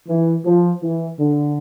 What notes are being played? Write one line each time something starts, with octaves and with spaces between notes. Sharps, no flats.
E3
F3
E3
D3